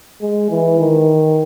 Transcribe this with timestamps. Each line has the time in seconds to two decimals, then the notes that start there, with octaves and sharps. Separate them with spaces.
0.21 G#3
0.50 E3
0.80 D#3